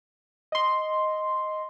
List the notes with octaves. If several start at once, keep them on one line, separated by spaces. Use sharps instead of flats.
D#5 C6